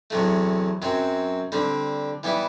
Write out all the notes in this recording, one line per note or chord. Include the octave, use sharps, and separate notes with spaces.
E2 C3 F#3 A3
F#2 F#3 C4
D3 G3 C4
E3 G3 B3 E4